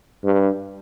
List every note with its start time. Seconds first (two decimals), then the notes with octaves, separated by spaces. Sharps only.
0.24 G2